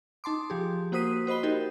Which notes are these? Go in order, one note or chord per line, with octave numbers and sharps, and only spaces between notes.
D#4 A5 C6 D6
F3 G4 G#4
A#3 F#4 C5 D#6 B6 D#7
F#4 C5 D#5 B5 G7
D#4 G4 A#4 D#5